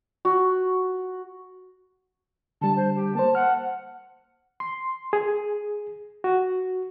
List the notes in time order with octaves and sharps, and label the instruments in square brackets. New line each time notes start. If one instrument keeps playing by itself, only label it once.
[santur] F#4
[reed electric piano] D3 G3 [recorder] A5
[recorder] C5
G4
[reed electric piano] A#3 C5 [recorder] A5
[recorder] F#5 [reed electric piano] F6
[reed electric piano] C6
G#4
F#4